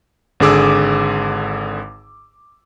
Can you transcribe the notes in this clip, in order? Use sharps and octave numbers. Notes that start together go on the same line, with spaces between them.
G#1 D3 G#4 D6 E6